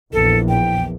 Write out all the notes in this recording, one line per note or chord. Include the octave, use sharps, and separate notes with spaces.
A#1 E2 A4
G5